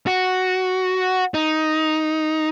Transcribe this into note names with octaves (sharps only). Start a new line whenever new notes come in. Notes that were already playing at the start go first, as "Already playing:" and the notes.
F#4
D#4